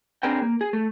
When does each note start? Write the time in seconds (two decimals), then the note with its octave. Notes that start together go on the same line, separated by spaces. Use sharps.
0.23 C4 D4 G#4 A#4 B4 G5
0.42 A#3
0.61 G#4
0.73 A3